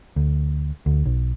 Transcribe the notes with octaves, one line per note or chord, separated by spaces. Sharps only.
D2
D2
B1